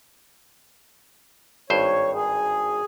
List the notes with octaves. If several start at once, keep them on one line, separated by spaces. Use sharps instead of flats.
G#1 G2 C5 C#5
G#4